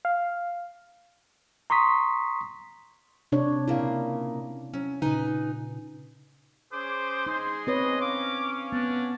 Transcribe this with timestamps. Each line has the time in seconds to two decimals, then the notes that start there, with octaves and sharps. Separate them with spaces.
0.05 F5
1.70 A#5 C6 C#6 D#6 B6
3.32 C3 D4 C#5
3.68 A#2 C#3 A#3 E4 F5
4.74 F#3 C#4
5.02 A#2 C#3 D#4 B4 G#5
6.72 C#4 G#4 C5 D6
7.27 G#3 D#4 G#4 C6
7.67 C4 B4 C#5 D#5
8.01 C#4 F5 D6
8.72 B3 D4